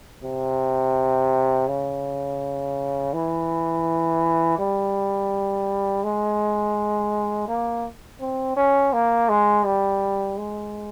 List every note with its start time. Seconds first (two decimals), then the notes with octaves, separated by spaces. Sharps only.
0.24 C3
1.68 C#3
3.13 E3
4.59 G3
6.04 G#3
7.48 A#3
8.21 C4
8.56 C#4
8.93 A#3
9.29 G#3
9.65 G3
10.38 G#3